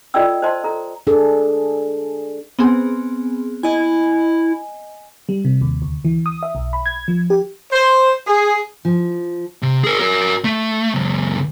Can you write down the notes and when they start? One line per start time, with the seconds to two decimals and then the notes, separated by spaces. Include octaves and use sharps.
0.14 F4 A4 D5 D#5 G5 E6
0.42 C5 C#5 D#5 A5 C6
0.64 A4 A#5
1.07 D4 G#4 A4
2.59 B3 C4 G#4
3.63 E4 D#5 G#5
5.29 G3
5.45 C3
5.61 D#2
5.82 D2
6.05 E3
6.26 D#6
6.43 E5
6.55 B1
6.73 B5
6.86 G#6
7.08 F3
7.30 G4
7.71 C5
8.26 G#4
8.85 F3
9.62 C3
9.84 G#4 A#4
10.00 F#4 A#4
10.44 A3
10.94 C#2 F#2